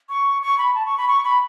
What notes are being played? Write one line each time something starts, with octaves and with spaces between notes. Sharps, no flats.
C#6
C#6
B5
A5
C#6
B5
C#6
B5